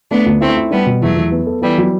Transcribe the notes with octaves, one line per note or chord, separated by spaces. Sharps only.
A3 B3 D4
D2
A3 C4 E4
E4
G3 B3 D4
B2
E2 F#3 A3
E2
B3
A4
E3 G3 B3
F#3